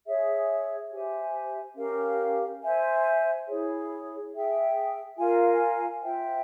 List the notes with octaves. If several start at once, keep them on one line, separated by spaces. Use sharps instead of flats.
G#4 C#5 E5
G4 C5 E5 G#5
C#4 G4 A#4 F5
C5 E5 G#5
E4 G#4 C#5
G#4 E5 G5
F4 A#4 F5 G#5
F4 C5 E5 G5